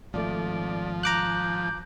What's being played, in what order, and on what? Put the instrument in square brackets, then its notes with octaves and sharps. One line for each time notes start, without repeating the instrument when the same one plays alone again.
[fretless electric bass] G#1 A3 [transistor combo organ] F3 [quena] D5
[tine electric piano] A#5 D6 F#6 [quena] G6